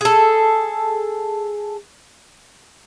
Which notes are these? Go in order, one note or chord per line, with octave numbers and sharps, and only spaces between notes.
G#4 A4